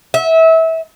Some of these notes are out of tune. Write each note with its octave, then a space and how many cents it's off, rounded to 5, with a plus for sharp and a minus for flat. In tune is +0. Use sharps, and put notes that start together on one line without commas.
E5 -25